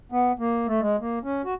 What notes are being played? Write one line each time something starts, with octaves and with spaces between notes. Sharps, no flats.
B3
A#3
A3
G#3
A#3
C#4
F#4